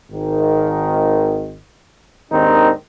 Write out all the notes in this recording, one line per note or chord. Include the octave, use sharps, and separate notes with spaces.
G#1 D#3
D#2 G#2 D#3 C4 D4 D#4